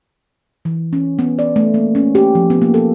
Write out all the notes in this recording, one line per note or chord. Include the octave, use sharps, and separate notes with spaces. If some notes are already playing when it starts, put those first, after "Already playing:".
E3
C#4
B3
D5
A3
A#3
C#4
G4
F3
B3
A#3
A4